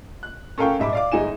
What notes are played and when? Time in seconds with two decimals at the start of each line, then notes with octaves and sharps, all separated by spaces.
0.23 F#6
0.58 C#4 A4 A#4 F5 G5 C#6
0.79 D#1 G#2 E5 B5 D6
0.93 D5 F5 D6
1.12 G1 G#3 D#4 E4 G#5 E7